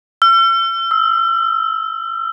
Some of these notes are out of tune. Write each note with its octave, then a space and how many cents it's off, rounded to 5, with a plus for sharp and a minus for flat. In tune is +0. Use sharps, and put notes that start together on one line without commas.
E6 +45
E6 -20